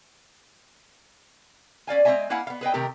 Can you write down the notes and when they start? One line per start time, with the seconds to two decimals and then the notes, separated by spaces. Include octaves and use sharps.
1.87 C#4 D5 F5 G#5
2.05 G#3 C4 F#4 D#5 E5 G#5
2.30 A#3 E4 F5 F#5 G#5
2.47 B3 F5
2.61 G#4 B4 D#5 G5
2.74 C3 D#3 A3 G4 A#4